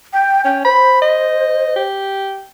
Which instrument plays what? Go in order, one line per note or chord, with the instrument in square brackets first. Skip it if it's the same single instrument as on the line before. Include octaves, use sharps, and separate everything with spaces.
[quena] G5
[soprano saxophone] C#4 [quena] G5
[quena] C5 [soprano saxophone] B5
[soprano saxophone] D#5
G4